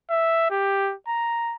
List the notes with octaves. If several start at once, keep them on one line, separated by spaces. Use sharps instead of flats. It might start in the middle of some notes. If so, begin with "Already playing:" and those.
E5
G4
A#5